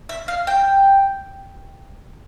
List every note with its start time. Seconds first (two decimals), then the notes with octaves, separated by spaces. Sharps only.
0.09 E5
0.28 F5
0.47 G5